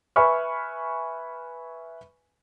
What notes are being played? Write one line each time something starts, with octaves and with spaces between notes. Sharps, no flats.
B4 E5 G#5 B5 C#6 F6